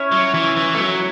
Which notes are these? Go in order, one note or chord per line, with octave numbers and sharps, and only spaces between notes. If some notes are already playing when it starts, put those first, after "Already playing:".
Already playing: C#4 E4 C#5
F#3
E3
E3
A3
F#3